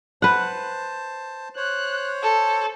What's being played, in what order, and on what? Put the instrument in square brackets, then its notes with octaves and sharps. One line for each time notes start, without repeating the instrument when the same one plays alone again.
[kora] B4 F#5 [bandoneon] C5 A5
[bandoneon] C5 C#5 [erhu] F#6
[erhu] A4